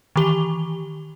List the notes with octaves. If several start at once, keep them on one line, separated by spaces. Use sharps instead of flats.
D#3 E3 G4 G7